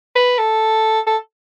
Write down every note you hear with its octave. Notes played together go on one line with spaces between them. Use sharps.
B4
A4
A4